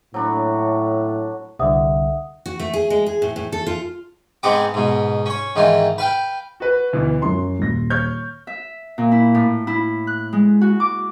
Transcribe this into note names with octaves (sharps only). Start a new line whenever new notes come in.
A2 F#3 D4 B5
C2 D3 E5 F#5 D#6
F#4
A3
G#4
G#3
G#4
A2
A2
A4
F4
G#2 G#3 B3 C4 F#5 D6
G#2 B2
C#4 C#5
G#2 D#3 E3 F4
B4 F5 G5
F#4 B4
D2 B2 E3
F#2 F#3 C6
D#1 A#6
C#5 F6 G6
E5
A#2
E4
A2
E4
F#6
G#3
F#4
D6